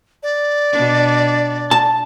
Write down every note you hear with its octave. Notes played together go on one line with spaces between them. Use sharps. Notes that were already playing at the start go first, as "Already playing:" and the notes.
D5
B2 D4
A5